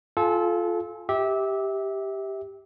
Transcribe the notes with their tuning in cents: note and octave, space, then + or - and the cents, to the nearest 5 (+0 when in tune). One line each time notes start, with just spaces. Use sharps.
F4 +0 A4 -25 G#5 +0
G4 +0 E5 -25